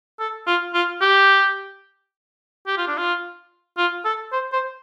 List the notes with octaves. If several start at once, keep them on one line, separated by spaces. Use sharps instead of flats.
A4
F4
F4
G4
G4
F4
D4
F4
F4
A4
C5
C5